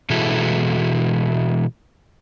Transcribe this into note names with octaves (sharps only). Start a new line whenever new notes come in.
B2 E3 G#3 E4 F#4 A4